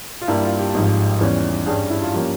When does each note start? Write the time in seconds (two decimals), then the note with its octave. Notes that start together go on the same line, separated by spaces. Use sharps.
0.22 F4
0.28 G2 G3 A#3 E4
0.43 F4
0.59 G4
0.74 G#1 G#2 F3
1.21 E2 E3 G3 C#4
1.66 G2 G3 C#4 G#4
1.90 E4
2.02 F4
2.14 F3 A#3 C#4 G4